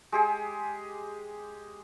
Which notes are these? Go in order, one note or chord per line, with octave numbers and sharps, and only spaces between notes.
G#3 G4 G#4